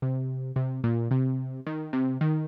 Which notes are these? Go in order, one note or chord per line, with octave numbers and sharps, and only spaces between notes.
C3
C3
A#2
C3
D#3
C3
D#3